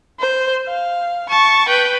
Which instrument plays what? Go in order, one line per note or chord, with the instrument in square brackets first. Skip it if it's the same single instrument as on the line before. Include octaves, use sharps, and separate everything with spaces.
[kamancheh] C5
F5
[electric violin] A5 [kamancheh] C#6
[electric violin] B4 [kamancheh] G5